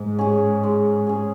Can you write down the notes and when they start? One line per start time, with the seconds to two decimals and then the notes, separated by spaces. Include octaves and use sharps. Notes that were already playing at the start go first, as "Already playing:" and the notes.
Already playing: G#2
0.19 C#4 G#4
0.63 G#3
1.07 C#4 G#4